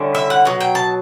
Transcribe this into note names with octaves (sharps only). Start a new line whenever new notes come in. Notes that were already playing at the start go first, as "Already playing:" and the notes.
Already playing: D3 G3 C#4 E4
E5
F#5
B2 F#3
G5
A5